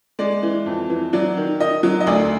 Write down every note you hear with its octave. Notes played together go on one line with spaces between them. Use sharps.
G#3 D5
E3
F2
E3
F#3 D5
D#3
D#3 D#5
F#3
D#5
D2 D5